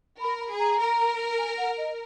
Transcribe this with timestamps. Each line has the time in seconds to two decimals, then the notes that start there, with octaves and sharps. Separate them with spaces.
0.20 A#4 B5
0.40 B5
0.50 G#4
0.59 A#5
0.79 A#4
1.38 G#5
1.57 F#5
1.77 D#5